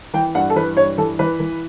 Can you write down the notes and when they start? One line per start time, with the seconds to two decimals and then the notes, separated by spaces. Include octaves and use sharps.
0.14 E3 G5
0.35 G2 F#5
0.50 A4
0.56 E3 B4
0.77 G2 C#5
0.98 E3 A4
1.19 E3 B4
1.40 E3